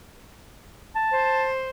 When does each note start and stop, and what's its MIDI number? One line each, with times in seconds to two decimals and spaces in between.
0.95 1.48 81
1.11 1.69 72